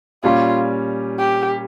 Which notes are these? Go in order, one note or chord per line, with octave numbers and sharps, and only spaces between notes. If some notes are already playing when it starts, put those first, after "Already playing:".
A#2 G3 C#4 F4
G4